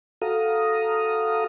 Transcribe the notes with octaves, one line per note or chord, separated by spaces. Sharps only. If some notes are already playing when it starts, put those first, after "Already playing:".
F#4 A4 F5 A#5 D#6